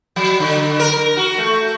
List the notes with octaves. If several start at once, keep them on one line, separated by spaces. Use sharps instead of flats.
F#3
D3
A#4
F#4
A3